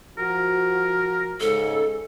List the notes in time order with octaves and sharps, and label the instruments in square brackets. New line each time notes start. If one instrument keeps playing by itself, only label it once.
[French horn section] F3 F#4 [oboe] A#4
[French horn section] G#2 C#3 G#3 [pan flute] A4